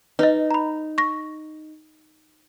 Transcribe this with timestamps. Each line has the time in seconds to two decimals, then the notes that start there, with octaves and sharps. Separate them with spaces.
0.19 D#4 B4 D#5
0.51 A#5 B5
0.98 C#6 A#6